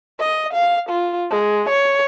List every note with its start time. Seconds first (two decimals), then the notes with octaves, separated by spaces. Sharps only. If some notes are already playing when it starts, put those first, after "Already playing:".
0.19 D#5
0.53 F5
0.89 F4
1.31 G#3
1.69 C#5